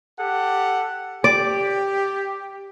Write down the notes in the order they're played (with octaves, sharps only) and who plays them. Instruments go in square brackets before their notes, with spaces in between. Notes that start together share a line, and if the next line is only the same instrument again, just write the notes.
[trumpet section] G4 A4 F#5
[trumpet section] G4 [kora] D5